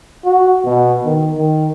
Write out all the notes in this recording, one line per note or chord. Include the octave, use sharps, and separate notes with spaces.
F#4
B2
D#3
D#3